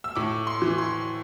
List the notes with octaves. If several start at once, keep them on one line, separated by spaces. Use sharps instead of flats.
E6
A2 D6
C6
E3
C6